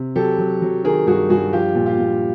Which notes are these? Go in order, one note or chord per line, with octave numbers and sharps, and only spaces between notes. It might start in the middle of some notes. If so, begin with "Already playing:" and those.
Already playing: C3
F#3 G4 A4
F#3
F#3
D#3 G#4 A#4
G2 F#4 G#4
G2 F#4 G#4
F3 F4 G4
A#2
F4 G4
A#2